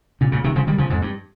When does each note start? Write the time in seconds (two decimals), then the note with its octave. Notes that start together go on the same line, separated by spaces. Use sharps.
0.21 A#2 C#3
0.32 A#2 C#3
0.44 C3 D#3
0.56 C#3 F3
0.67 D#3 G3
0.78 C#3 F3
0.90 F2 G#2
1.02 G2